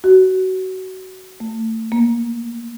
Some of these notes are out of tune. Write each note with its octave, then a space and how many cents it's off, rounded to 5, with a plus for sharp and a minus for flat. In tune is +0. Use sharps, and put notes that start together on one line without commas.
F#4 +20
A3 +30
A#3 +15